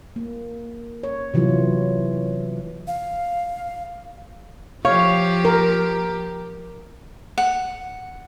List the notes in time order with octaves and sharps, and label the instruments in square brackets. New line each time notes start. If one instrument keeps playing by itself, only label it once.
[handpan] A#3
C#5
C3 E3 F#3 E4 F4
[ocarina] F5
[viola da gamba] F3 G4 [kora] C#5 [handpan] F5
[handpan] A#4
[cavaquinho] F#5